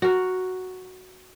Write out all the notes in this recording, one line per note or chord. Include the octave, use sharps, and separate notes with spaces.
F#4 A#4